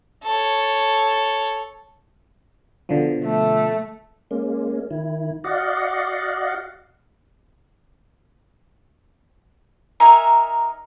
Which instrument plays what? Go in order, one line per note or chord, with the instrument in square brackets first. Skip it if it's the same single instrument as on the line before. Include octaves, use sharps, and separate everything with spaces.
[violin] A4 C#5
[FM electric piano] B2 D3 F3
[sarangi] A3
[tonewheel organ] G#3 A#3 C#4
D#3 E4
F#4 D5 D#5 F5 F#5
[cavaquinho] D#4 A#4 E5 G#5